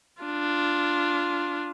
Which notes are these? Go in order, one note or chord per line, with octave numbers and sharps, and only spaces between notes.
D4 F4